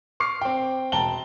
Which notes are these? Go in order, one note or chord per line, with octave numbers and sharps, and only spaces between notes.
C#6 D6 F6 C7
C4 G5
E1 G5 A5 A#5 G7